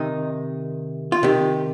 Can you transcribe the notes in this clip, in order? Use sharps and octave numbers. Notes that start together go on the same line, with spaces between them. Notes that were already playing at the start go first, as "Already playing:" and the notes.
Already playing: C3 D#3 D#4
F4
C3 D#3 G4